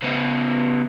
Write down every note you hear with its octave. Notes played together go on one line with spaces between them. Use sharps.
C#3 B3